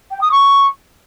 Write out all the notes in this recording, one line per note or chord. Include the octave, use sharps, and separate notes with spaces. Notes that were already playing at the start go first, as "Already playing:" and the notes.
G5
D#6
C#6